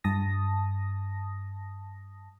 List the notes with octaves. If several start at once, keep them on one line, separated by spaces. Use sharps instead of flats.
G2 A5 D#6 A#6